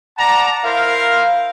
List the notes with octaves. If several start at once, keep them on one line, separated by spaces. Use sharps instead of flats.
D5 F#5 A5 A#5
E4 A#4 C5 F5